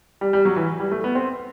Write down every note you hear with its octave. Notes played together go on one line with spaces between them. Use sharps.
G3
G3
F#3
E3
G3
A3
B3
C4